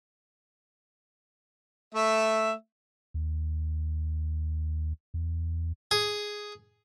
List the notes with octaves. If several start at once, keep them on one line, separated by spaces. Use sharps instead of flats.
A3 E5
D#2
E2
G#4